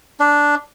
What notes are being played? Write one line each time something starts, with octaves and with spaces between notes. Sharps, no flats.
D4